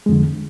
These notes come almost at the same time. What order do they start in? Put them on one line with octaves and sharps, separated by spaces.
G#3 F2 D3